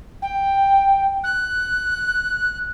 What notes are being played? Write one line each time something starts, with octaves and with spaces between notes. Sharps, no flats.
G5
F#6